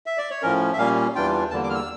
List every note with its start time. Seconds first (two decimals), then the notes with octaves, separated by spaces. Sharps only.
0.06 E5
0.18 D5
0.30 C#5
0.42 A2 F3 C#4 A#4
0.73 E5
0.78 A#2 G3 A#3 C#4 F5
1.15 E2 E3 G3 D4 F4 G5
1.51 E2 D3 G3 A#3 A5
1.64 D6
1.70 F6
1.75 E6